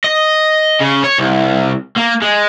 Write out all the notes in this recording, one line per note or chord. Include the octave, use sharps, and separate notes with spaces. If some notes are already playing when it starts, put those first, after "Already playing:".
D#5
C#3
C#5
C2
A#3
G#3